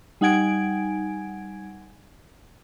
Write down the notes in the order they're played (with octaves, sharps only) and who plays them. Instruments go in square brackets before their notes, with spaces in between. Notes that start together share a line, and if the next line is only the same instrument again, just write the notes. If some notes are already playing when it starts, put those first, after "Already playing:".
[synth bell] G3 D#4 F#5 G#5 G#6 D7